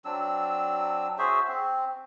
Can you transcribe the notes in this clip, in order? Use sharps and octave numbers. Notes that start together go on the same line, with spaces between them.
F#3 C4 D4 E6
F#4 G#4 C5 E5
C4